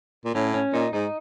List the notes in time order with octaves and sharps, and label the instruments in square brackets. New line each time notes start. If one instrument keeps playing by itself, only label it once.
[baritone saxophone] A#2
[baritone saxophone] A2 [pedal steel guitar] C#4
[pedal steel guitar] C#4
[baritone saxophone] A#2 [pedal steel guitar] D#4
[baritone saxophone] G#2 [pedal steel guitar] D#4